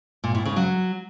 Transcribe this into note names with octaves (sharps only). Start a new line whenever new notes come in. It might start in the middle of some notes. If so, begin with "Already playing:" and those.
A#2
A2
C#3
F#3